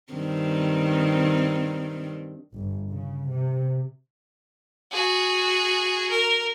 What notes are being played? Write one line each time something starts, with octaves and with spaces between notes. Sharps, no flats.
G2 D#3 C4
G1
C#3
C3
F#4 G#4
A#4